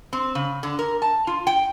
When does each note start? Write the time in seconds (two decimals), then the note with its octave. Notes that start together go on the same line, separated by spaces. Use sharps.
0.13 C4
0.35 C#3
0.63 D3
0.79 A#4
1.02 A5
1.27 F4
1.47 G5